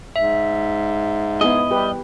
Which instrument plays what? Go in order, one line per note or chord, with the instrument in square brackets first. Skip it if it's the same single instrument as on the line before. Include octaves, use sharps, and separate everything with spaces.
[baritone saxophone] G#2 [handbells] E5
[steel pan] B3 E4 G#4 [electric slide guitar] D#5
[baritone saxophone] G3 [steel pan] G4 B4